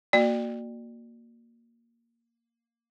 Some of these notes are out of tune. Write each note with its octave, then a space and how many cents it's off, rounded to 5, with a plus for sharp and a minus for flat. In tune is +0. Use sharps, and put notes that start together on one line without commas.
A#3 +0 F#4 -10 D5 +20